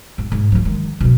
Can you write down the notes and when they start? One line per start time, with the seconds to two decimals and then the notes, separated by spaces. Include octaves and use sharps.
0.18 G#2
0.32 G#2
0.52 F3 A3
0.65 D#3 G#3
1.01 B2 F3